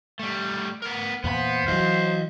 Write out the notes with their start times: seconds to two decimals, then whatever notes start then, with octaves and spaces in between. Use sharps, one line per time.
0.19 G3 A3
0.82 B3 A#4
1.24 E2 A#2 B3 C5 B5
1.68 E3 F#3 D#5 F5